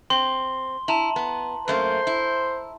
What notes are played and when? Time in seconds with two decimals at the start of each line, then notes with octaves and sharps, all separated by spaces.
0.10 C4 C6 G7
0.88 E4 A5 A#5 F#7
1.16 B3
1.68 F#2 A3 A#3 C5
2.07 E4